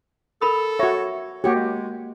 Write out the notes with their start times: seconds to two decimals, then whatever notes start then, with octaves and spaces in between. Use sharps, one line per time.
0.41 A4 A#4 B5 D#6
0.79 F#4 C#5 E5
1.44 A#3 F#4 G4 C#5
1.56 G#3